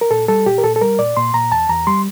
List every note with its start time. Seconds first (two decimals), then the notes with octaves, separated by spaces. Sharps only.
0.01 A#4
0.11 A#2 A4
0.28 G3 A4
0.46 A#2 G4
0.58 A#4
0.64 A#2 A4
0.76 A4
0.81 G3 A#4
0.99 A#2 D5
1.17 A#2 C6
1.34 A#2 A#5
1.52 E2 A5
1.69 E2 A#5
1.87 G3 C6